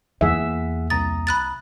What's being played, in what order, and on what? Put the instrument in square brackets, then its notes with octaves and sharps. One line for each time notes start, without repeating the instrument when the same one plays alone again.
[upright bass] E2 A#3 [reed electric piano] E3 G#4 F#5 [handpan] E5
[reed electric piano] C2 A#5 D#6 [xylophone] A6
[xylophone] B5 F#6 A6